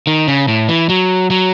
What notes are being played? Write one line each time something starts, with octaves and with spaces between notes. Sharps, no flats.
D#3
C#3
A2
E3
F#3
F#3